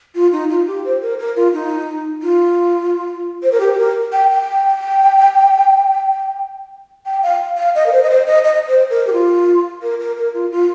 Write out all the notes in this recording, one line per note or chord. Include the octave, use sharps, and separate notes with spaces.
F4
D#4
F4
G4
C5
A#4
A#4
F4
D#4
F4
C5
A#4
G4
G4
A#4
G5
G5
G5
F5
F5
D#5
A#4
C5
D#5
C5
D#5
D#5
C5
A#4
G4
F4
A#4
A#4
A#4
F4
F4